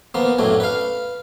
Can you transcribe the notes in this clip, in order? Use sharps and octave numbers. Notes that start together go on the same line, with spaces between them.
F3 A#3 B3
F#2 A2 F#3 D4
B4 F5